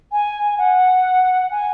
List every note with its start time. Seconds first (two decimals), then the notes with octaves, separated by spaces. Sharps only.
0.11 G#5
0.58 F#5
1.51 G#5